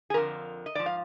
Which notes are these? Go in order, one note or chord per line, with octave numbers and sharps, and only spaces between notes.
G#4
F2 D3 F3 A#4
D#5
G#2 F3 D5
F5